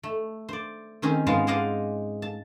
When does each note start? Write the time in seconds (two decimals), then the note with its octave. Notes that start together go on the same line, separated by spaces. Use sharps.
0.03 A3
0.49 C5 D5
1.02 D#3 C4 C#4 G#4
1.27 G#2 G#3 B3 F4 F5 A5
1.47 G#4 C5 D5 D#5 F5 F#5
2.22 A5